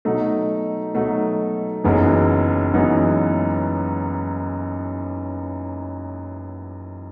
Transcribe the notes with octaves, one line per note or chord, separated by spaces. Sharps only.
B2 F#3 A3 D#4
B2 F#3 A3 D#4
F#1 F#2 E3 B3 D#4
F#1 F#2 E3 B3 D#4